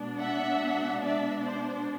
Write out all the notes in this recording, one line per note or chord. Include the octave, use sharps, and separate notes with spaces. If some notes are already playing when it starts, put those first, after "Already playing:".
Already playing: B2 G#3 B3 D4
E5 F#5
D5 E5
C5 D5